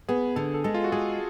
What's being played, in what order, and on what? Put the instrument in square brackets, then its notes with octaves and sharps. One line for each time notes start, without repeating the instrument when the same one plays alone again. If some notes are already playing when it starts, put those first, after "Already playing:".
[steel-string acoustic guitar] B3 [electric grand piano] G#4
[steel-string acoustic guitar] D3 [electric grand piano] A4
[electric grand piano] A4
[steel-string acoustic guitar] G#3 [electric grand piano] A4
[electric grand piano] F4
F#4
[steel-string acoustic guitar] G#3 [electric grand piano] G#4